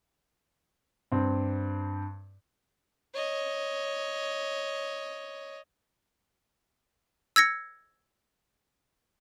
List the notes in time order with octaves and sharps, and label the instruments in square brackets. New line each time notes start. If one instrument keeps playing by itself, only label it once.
[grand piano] G2 C4
[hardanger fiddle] C#5 D#5
[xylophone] E6 G#6 A#6 C#7